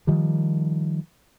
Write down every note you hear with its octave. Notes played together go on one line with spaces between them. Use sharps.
D#3 F3 G3